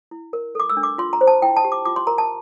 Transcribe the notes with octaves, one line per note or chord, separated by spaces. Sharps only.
E4
A#4
A4 D6
E6
D4
D6
F4 C6
A#5
C5
A5
E4 G5
A5
G4
D6
F4 D6
C6
A#4 A#5
A5